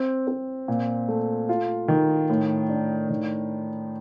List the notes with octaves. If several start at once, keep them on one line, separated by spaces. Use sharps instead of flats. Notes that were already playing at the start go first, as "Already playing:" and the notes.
Already playing: C4
C4
A#2
A3
F4
D#3
A2
D4
D#3